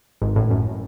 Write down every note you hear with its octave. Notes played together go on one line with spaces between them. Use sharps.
G#1 G#2
A1 A2
F#2